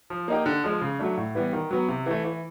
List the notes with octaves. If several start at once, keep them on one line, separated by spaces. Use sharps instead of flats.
F3
A#3 D#4 G4
D3
F3 G#3
C#3
F#3 A3 D4
A2
E3 G3 B3
D#3
F#3 B3
C3
E3 A3
E3